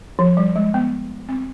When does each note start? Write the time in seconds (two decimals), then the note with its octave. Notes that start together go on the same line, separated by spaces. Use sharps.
0.19 F3
0.37 G3
0.56 G#3
0.74 B3
1.29 C4